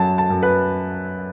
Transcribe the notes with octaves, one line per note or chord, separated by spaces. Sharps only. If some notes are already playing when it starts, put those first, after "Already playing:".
Already playing: F#2 F#3 A5
A5
F#2
B4